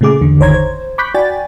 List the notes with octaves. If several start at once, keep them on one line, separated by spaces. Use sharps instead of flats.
A#2 C#3 A3 G#4 D6
E2 D3
G#1 D#3 C5 C#5 A#5 G#6
C5
B5 C#6 D6 F#6 G6 B6
F#4 D5 G5 G#5 A6